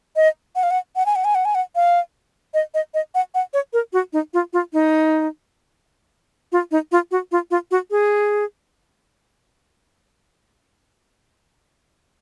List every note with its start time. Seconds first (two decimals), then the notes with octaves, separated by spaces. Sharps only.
0.16 D#5
0.55 F#5
0.63 F5
0.71 F#5
0.96 F#5
1.06 G#5
1.16 F#5
1.24 G#5
1.35 F#5
1.45 G#5
1.55 F#5
1.76 F5
2.54 D#5
2.74 D#5
2.94 D#5
3.15 F#5
3.35 F#5
3.54 C#5
3.73 A#4
3.93 F#4
4.13 D#4
4.34 F4
4.53 F4
4.73 D#4
6.52 F4
6.71 D#4
6.92 F4
7.11 F#4
7.32 F4
7.51 F4
7.71 F#4
7.91 G#4